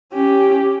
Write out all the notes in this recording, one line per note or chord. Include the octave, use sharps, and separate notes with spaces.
C#4 G4